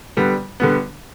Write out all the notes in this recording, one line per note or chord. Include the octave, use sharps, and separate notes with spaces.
D3 G3 B3
D3 G3 B3